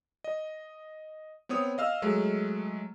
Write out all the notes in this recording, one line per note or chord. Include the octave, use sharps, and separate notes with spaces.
D#5
B3 C4 C#5 D#6
D#5 F5 E6 F6
F#3 G#3 A3